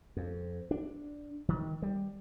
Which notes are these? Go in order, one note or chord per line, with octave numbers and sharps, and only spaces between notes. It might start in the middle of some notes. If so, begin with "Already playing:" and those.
F2
D4
D#3
G3